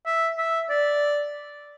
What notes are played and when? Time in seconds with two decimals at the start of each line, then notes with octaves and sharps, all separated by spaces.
0.06 E5
0.38 E5
0.69 D5